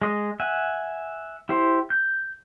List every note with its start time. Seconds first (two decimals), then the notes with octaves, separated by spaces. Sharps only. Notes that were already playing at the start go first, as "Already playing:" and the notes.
0.02 G#3 D#5
0.40 E5 F#5 G#5
1.49 E4 G4 C5
1.90 G6